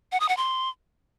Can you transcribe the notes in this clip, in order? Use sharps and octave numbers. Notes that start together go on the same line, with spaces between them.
F#5
D#6
F#5
C6